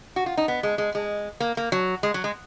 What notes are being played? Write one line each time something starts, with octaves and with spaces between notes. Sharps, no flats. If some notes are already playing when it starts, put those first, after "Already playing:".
F#4
F4
D#4
B3
G#3
G#3
G#3
A#3
A#3
F#3
G#3
F#3
G#3